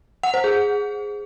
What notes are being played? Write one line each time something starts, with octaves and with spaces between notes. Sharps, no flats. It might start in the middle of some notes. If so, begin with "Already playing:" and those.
F#5
C5
G#4